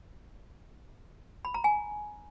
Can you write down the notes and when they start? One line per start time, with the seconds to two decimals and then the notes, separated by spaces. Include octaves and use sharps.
1.45 B5
1.54 A#5
1.64 G#5